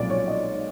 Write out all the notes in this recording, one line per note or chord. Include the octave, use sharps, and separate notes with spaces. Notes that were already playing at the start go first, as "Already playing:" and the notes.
Already playing: B1 A#2 F3 G#3 C4 D5
C#5
D#5